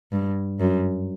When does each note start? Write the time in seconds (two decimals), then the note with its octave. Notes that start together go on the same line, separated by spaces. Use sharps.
0.12 G2
0.60 F#2